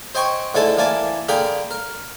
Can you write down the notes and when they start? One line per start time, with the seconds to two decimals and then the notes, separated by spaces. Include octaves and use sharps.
0.15 C5 D#5 G5 G#5 C#6
0.55 G#2 D3 A3 E4 G#5 A5
0.77 E3 A#3 D5 G#5 A5
1.29 D3 A#3 G#4 G5 A#5 B5
1.71 A#4